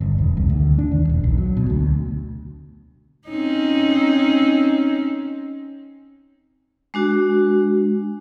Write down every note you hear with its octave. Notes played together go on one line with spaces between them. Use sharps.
G1
E1
C2
D2
D4
D#2
E1
B1
F#3
B2
D2
C4 C#4 D#4
G#3 D4 F#4